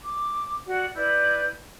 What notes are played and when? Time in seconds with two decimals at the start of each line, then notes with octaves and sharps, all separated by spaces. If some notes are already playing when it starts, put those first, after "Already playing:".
0.04 D6
0.67 F#4 D5 F#5
0.94 E4 B4 D5 G6